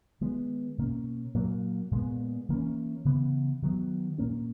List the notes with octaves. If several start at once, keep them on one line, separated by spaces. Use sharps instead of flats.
D#3 G#3 B3
B2 A#3 C#4
A#2 F#3 A#3
A#2 G#3 B3
E3 A#3 C#4
C#3 E3 B3
D#3 F#3 B3
A#2 A#3 C#4